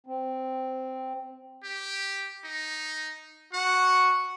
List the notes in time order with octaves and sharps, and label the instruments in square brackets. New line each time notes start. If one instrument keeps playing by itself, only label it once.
[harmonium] C4
[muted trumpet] G4
D#4
[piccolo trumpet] F#4 [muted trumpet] F#5